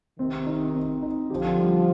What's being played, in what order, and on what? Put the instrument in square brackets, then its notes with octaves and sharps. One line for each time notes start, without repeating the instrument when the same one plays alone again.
[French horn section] C3 D#3 [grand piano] C4
[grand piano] D#4
C4
D#4
[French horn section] D3 F3 [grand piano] G4
[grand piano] G3